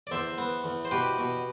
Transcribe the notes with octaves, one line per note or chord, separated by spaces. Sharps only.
D5
E2 C5 E5
B3
E2
C5
B2 G4 B4
B2